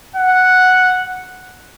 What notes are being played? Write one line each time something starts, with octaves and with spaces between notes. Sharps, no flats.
F#5